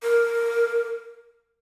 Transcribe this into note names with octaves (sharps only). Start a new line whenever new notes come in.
A#4